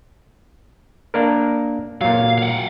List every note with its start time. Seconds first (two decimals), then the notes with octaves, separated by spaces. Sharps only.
1.14 A#3 D4 A#4
2.01 A#2 F#3 F5
2.38 F5 F#5